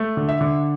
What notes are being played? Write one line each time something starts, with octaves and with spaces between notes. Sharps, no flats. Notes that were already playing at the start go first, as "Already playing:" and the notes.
Already playing: A3
D3
E5
D3